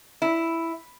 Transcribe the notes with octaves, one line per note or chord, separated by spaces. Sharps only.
E4